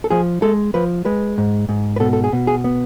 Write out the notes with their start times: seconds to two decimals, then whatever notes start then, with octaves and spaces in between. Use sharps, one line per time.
0.04 A4
0.10 F3 G#4
0.42 G#3 A4
0.74 F3 B4
1.05 G#3 B4
1.38 G#2
1.69 G#2
1.96 B4
2.00 B2 A4
2.13 A4
2.24 G#4
2.33 B2
2.47 G#4
2.64 B3